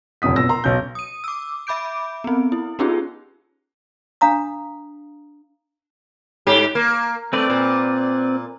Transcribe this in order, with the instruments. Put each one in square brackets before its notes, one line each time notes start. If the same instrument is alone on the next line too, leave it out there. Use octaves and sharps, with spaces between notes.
[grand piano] F1 A#1 F#2 D#6 B6
B2 E6 A#6
A#4 A#5 C6
B1 C#4 G6
[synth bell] D#6 D#7
D6 E6
E5 B5 D6 G6 D7
B3 C4
E4
B3 C#4 D#4 F4 G4 G#4
[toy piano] D4 F5 A#5 D#6
[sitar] G#2 G4
A#3
[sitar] A3 [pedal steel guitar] C4 B4 D5
[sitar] A#2